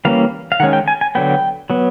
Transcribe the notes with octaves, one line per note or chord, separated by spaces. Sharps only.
E3 G3 A#3 C#4 F5
F5
D#3 G#3 C#4 F#5
G5
G#5
G#5
D3 F#3 B3 G5
F#3 B3